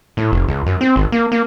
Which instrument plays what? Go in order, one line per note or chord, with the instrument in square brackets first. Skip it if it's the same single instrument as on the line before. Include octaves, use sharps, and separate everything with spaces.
[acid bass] A2
F1
C#2
F#2
C4
G#1
A#3
A#3